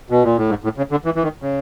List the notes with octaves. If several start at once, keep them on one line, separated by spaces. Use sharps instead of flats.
B2
A#2
A2
G#2
A2
C#3
D3
E3
E3
D#3
C#3